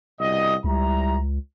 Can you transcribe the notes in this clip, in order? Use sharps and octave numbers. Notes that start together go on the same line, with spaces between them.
C2 B2 D#5
C#2 G3 E4 A#5